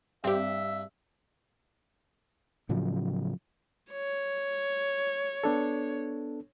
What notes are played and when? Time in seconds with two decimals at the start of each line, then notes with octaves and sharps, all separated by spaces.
0.24 G2 C4 G4 E5
2.69 A2 C#3 F3 F#3
3.92 C#5
5.44 B3 D4 A4